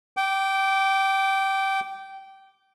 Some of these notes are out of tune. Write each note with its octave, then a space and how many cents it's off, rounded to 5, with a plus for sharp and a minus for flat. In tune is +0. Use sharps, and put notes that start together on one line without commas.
G5 -20 D6 +0